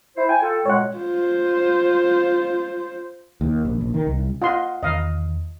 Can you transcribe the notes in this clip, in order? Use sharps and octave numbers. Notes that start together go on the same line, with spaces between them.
E4 C5
G5 G#5
F4 A4
F#2 A#2 G#3 C#5 F#5
F4 C5
D#2
A#1
A#1
D#3
C2
F4 D#5 F#5 C6
E2 D#3 D#5 F5